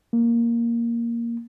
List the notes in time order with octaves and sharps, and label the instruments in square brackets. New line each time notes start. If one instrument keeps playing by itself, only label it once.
[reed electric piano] A#3